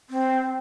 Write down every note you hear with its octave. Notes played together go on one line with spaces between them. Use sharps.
C4